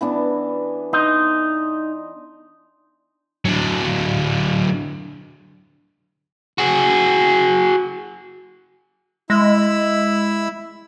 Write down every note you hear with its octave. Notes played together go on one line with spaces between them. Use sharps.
E3 B3 D4
D#4 C6
D3 F#3
F#4 G#4
G#3 E4 B5 E6